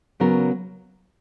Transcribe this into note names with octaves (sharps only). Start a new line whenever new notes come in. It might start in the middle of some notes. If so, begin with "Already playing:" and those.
C#3 F#3 B3 F#4 A#4